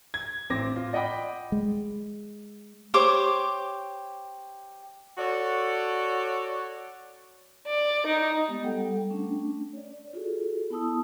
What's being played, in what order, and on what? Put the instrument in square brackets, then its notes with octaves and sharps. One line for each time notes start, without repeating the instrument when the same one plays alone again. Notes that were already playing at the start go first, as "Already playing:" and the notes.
[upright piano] G#6
A1 C4 D6 A#6
F4
D5 D#5 F#5 G5 B5 D6
[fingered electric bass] G#3
[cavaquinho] G4 C5 C#5 D6
[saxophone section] F#4 A4 C#5 D5
[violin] D5
D#4
[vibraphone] G#3 B3 G4
G3 A4 F#5 G5
A3 C#4 D4
C#5 D5
F4 F#4 G#4 A4
B3 E4 A5 D#6 E6